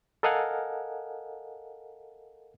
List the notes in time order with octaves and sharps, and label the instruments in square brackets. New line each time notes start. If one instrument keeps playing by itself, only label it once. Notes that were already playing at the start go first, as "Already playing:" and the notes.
[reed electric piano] A4 A#4 D#5 F5 F#5 G#5